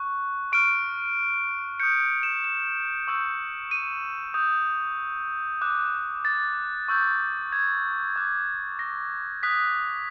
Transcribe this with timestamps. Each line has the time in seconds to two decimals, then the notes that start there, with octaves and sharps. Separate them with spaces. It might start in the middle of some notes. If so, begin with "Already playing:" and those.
Already playing: C#6 F#6
0.52 C#6 F6 D7
1.80 D#6 G6 C#7
2.23 E7
2.44 E7
3.08 C#6 E6 G6
3.71 D#7
4.34 D#6 G6
5.61 D6 F#6
6.25 A6
6.88 C#6 E6 G6
7.52 G#6
8.16 D6 F#6
8.79 A#6
9.43 D#6 F#6 B6